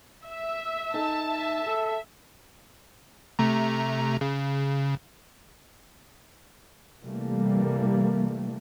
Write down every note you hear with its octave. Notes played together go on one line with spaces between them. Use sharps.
E5
D#4 G#4 A4 A5
E5
G#4 A4
C3 A3 A#5
C#3
C3 E3 G3 A3 A#3